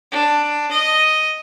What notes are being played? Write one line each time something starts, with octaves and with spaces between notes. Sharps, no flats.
D4
D#5